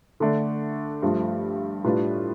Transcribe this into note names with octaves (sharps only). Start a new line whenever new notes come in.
D3 A3 D4
G2 F3 A3
A2 G3 D4 F4 B4